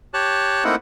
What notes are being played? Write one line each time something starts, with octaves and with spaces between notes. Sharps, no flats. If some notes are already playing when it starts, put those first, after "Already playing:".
G4 C#5 A5 F#6
A3 A#3 C4 D#4 E4 F#5